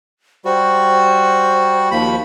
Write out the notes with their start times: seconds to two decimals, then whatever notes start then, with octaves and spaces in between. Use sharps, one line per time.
0.45 G3 F#4 C5
1.91 D#2 F3 B5